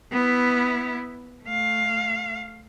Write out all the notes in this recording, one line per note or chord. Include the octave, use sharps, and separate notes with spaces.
B3 E4
A3 F5